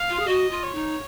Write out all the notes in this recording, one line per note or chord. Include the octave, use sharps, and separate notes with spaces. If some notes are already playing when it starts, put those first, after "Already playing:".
Already playing: F5
F4
G#4
F#4 D#5
F4
C#5
D#4